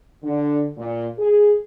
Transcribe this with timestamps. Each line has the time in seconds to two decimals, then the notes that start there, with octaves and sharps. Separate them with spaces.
0.24 D3
0.77 A#2
1.19 G#4